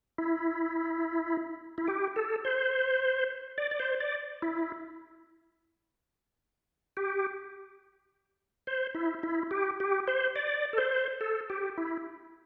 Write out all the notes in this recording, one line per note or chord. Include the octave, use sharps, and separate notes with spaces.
E4
E4
G4
A4
C5
D5
D5
C5
D5
E4
G4
C5
E4
E4
G4
G4
C5
D5
A4
C5
A4
G4
E4